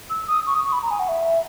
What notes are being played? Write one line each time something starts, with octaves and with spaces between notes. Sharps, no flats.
E6
D#6
C#6
D#6
C#6
B5
A#5
G#5
F#5
E5